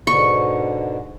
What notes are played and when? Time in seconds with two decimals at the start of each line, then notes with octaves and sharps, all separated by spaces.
0.07 G#2 B2 D3 C#6